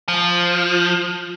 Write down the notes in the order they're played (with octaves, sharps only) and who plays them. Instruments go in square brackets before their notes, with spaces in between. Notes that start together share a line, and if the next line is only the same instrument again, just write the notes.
[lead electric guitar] F3